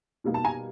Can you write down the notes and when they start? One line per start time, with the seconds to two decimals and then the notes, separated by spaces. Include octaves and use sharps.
0.24 B2 G3 A#3 D#4
0.34 A5
0.45 G#5 A#5